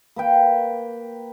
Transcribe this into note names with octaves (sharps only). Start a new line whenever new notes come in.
A#3 B4 G5